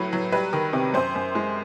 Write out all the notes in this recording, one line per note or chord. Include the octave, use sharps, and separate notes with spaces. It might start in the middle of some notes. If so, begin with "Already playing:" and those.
Already playing: A2 F#3 B4
F#3
G3 B4
D#3
C3
F#2 C5
F#2
G#3